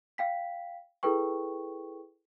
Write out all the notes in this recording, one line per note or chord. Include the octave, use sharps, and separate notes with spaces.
F5 G5 B6
E4 G#4 A4 B4 G5 C#6